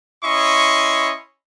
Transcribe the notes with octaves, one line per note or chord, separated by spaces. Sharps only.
C#4 E4 C#5 D#5 C6 C#6